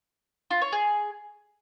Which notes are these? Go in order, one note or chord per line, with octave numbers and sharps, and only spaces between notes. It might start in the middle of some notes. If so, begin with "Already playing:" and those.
F4
C#5
G#4